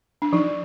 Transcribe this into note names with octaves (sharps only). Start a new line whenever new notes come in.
D4
F3 D#4